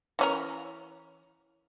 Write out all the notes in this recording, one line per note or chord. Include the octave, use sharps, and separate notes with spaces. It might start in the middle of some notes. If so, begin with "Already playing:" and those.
E3 C#4 A#4